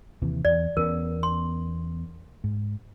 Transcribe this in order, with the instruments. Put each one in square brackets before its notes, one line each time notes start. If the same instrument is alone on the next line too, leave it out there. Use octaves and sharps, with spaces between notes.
[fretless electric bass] D#2 C3 E3
[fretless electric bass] E2 [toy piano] D5
[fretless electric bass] E2 B3 C#4 [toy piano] A#4
[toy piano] C6
[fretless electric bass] G#2